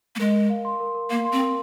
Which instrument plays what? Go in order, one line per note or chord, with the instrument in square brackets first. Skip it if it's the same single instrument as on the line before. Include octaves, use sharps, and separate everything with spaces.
[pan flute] A#3
[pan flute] G#3 [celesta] A#4
[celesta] A#4
F5
C6
A#4
A#4
[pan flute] A#3 [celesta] F5
[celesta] C6
[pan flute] C4
[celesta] A#4